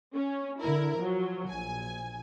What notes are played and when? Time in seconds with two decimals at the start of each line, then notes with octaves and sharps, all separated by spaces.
0.14 C#4
0.61 D3 E4 A#4
0.98 F3 F#3
1.49 A#1 G#5